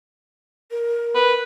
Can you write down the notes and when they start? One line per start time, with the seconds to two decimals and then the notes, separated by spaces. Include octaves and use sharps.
0.71 A#4
1.15 B4